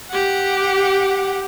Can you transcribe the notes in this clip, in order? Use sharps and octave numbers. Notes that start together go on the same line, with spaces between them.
G4 F#5